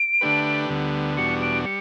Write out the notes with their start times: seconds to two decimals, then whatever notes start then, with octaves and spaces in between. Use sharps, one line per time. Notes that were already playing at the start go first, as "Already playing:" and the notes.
Already playing: D7
0.21 D3 A3 D4 G4 B4
0.69 D2 D3 G3 B3
1.17 E2 B2 G3 D4 F#4 C#7
1.41 D7
1.65 G3 C#7